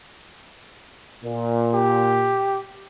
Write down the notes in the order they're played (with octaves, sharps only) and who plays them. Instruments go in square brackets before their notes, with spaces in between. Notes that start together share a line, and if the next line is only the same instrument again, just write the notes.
[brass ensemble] A#2
[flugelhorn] G4